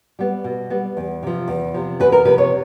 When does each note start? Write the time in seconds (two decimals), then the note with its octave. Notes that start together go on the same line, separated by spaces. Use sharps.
0.19 G3 B3
0.44 B2
0.70 G3 B3
0.97 E2
1.23 C3 F3
1.48 E2
1.74 C3 F3
2.00 E2 B4
2.12 A#4
2.25 C3 F3 B4
2.38 C#5